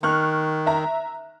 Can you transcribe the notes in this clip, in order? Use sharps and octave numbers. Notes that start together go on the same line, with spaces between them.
D#3 C#6 F6 F#6
E5 A#5